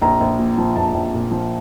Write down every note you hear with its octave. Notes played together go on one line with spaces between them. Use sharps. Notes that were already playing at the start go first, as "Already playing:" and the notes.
A#1 A#5
A#1
A#2
F3
A#1 A5
A#1
A#2
F3